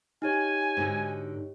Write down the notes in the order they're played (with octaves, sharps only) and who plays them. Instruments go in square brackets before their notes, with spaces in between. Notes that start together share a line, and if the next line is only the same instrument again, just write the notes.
[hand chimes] D#4 G4 C#5 [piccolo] G#5
[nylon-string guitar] G#2 B2 D3